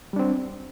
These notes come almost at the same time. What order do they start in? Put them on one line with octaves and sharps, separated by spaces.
G3 D4 C4